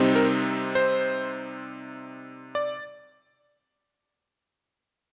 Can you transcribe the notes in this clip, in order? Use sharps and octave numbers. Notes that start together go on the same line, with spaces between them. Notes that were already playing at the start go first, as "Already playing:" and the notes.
Already playing: C3 G3 C4 D#4
A#4
C5
D5